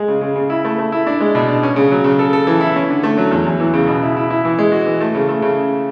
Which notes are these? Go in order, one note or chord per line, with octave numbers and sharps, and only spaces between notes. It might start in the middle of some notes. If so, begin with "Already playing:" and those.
Already playing: G#3 G#4
C#3
C#3
C#3
E4
A3
A3
E4
D4
G#3
B2
D4
C#4
C#3
F#3
C#3
A4
A4
E3
E4
C#4
D3
A3
F#3
E2
E2
E3
C#3
B2
E4
E4
E4
E3
G#3
F#4
E3
A3
C#3
A3
C#3